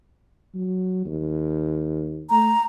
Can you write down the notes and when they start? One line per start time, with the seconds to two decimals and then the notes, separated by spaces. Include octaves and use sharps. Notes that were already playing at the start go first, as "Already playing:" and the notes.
0.55 F#3
1.05 D#2
2.30 A3 A#5